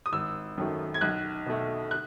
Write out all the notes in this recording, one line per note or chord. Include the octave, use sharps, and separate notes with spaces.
D#6
G#1 E6
F#2 D#3 F#3 A3
G#6
B1 F#6
B2 A3
F#6